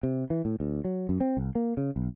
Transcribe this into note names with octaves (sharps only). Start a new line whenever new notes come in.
C3
E3
A2
D2
F#3
F#2
C4
C2
A#3
C#3
B1